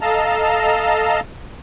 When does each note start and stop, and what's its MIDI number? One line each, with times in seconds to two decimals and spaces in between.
0.01 1.20 69
0.01 1.20 75
0.01 1.20 77
0.01 1.20 81
0.01 1.20 82